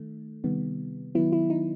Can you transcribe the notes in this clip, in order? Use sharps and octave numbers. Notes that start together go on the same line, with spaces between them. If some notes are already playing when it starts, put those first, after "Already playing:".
Already playing: D#3 A3
C3 D#3 G3 B3
D#3 F#3 B3 E4
E4
D#4